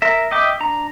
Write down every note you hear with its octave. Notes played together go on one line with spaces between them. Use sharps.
A#4 E5
D#5 E5 G5 D6
D4 A#5